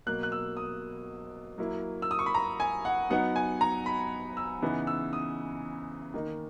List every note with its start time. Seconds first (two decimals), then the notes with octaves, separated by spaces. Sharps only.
0.07 B2 F#3 A#3 F#6
0.23 F#6
0.32 E6
0.57 D#6
1.58 F#3 A#3 E4
2.02 E6
2.11 D#6
2.19 C#6
2.26 B5
2.35 A#5
2.60 G#5
2.85 F#5
3.10 F#3 B3 D#4 F#5
3.36 G#5
3.61 A#5
3.86 B5
4.37 E6
4.62 C#3 E3 B3 D#4
4.87 E6
5.13 D#6
6.14 D#3 A#3 D#4